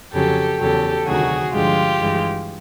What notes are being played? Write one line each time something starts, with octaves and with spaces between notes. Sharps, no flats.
F2 C#3 F#3 G4 A4
E2 C#3 F#3 G4 A4
D2 C3 D#3 F#3 F#4 G#4
G2 D3 F3 G#3 F4 G4
G2 E3 G#3